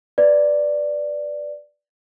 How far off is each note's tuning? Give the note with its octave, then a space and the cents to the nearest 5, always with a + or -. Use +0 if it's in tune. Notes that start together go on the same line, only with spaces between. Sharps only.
B4 +0 D5 +0